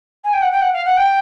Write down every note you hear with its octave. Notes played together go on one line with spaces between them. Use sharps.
G#5
G5
F#5
G5
F#5
F5
F#5
G5